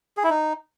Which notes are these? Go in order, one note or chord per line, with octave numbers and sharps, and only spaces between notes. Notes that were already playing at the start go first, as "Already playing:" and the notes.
G#4
E4
D#4